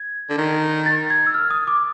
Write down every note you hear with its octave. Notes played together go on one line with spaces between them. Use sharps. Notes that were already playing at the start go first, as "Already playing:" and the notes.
Already playing: G#6
D3
D#3
A6
G#6
E6
F6
D#6
D6